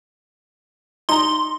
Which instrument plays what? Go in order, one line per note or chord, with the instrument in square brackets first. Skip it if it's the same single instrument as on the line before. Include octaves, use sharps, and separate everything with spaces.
[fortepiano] D#4 A#5 [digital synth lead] C6